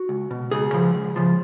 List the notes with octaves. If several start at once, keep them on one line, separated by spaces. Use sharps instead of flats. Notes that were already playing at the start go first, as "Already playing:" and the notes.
Already playing: F#4
C#2
B2
C#2 G#4
C#3 F3
C#2
C#3 F3